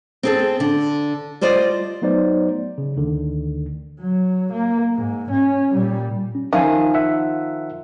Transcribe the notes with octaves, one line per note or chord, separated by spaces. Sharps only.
C4 G#4 A4
D3
G3 F4 C5 D5 D#5
F#3 A3 B3 D#4 C5 D5
C#3
D2 D3 D#3
F#3
A#3
G#2
C#4
A#2 G3
C#4
D#3 F3 E5 F5 G#5
E5 F#5